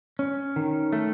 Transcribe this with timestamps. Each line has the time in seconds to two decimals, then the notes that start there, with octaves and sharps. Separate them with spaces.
0.19 C#4
0.56 D#3
0.92 A3